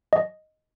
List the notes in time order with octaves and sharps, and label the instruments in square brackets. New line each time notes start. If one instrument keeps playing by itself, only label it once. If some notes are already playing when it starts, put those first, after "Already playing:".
[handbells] D#5